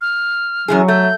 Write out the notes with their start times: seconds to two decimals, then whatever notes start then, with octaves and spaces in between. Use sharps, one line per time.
0.01 F6
0.68 F#2 E3 F#3 G#4
0.88 A3 G6